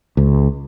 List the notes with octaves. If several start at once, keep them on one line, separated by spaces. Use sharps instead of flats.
C#2